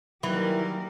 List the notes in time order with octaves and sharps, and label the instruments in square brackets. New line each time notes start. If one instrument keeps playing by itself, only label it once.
[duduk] D#3 [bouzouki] E3 [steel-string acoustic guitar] F#3 [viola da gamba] G3 A#3 A#4